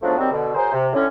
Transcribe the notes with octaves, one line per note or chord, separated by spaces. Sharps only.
G#2 F3 F#3 A3 B3 D4
D#3 F#3 G3 C4
B2 D3
F#3 G#4 A#4 C5
C3
A2 D3 C#4